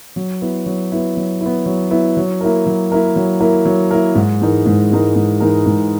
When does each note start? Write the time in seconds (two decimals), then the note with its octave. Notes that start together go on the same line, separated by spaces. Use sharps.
0.16 F#3
0.42 B3 E4
0.66 F#3
0.92 B3 E4
1.17 F#3
1.41 E4
1.46 B3
1.66 F#3
1.91 B3 E4
2.17 F#3
2.41 A#3 E4 A#4
2.66 F#3
2.92 A#3 E4 A#4
3.16 F#3
3.40 A#3 E4 A#4
3.65 F#3
3.91 A#3 E4 A#4
4.15 G#2
4.41 E3 G#3 D#4 A#4
4.66 G#2
4.90 E3 G#3 D#4 A#4
5.15 G#2
5.41 E3 G#3 D#4 A#4
5.66 G#2